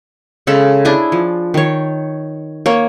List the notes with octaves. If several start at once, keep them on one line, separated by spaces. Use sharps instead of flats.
C#3 G#3 A4 B5
D4 E4 G#4 D6
F3
D#3 C#5
A#3 C#5